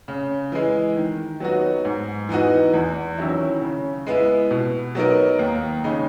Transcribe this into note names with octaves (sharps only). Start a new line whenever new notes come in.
C#3
E3 G#3
D#3
F#3 B3 D#4 F#4
G#2
E3 B3 D#4 F#4
E2
D#3 F#3 C#4 E4
C#3
G#3 B3 E4
B2
F#3 B3 D#4 A#4
D#2
C#3 G#3 D#4